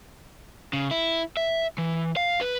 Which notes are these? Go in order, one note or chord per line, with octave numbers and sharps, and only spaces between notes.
C#3
E4
E5
E3
F5
B4